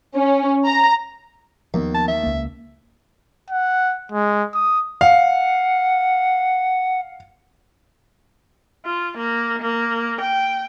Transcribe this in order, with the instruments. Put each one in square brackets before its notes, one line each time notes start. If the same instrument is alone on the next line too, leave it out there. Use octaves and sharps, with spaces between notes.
[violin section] C#4
A#5
[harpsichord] D#2 [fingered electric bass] F3 A#3 B3
[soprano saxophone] A5
E5
[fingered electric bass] C#2 A#3
[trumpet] F#5
G#3
D#6
[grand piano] F5 [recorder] F#5
[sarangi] F4
A#3
A#3
G5